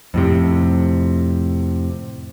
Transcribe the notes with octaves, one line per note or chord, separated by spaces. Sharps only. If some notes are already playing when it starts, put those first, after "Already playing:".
F2 A2 C3